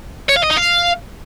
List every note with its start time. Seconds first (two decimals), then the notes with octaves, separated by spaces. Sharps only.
0.29 C#5
0.36 F5
0.43 D#5
0.50 D#4
0.57 F5